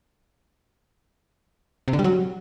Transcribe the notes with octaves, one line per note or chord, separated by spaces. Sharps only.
C3
D3
G3
F#3